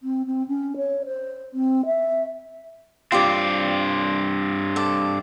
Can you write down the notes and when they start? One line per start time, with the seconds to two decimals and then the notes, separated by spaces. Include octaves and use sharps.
0.03 C4
0.26 C4
0.48 C#4
0.77 C#5
1.06 C5
1.54 C4
1.86 E5
3.12 G2 C4 F4 G4 D5
4.76 A4 D5